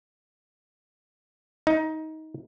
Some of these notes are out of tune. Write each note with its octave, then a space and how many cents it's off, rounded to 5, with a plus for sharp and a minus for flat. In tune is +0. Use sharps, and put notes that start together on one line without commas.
D#4 +20